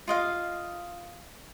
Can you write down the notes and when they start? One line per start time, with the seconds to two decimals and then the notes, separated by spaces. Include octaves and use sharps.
0.08 F4 D#5 F5